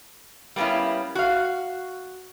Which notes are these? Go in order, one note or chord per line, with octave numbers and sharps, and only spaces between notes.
G3 A#3 B3 C#4 E4
F#4 F5